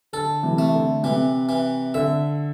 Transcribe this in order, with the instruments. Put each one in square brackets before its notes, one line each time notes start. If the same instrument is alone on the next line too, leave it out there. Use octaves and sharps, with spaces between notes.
[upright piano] D3 [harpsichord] A4
[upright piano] C3 E3
[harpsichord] A3
[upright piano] D3
[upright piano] C3 [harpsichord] E3
[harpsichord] E3
[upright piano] D3 [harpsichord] E5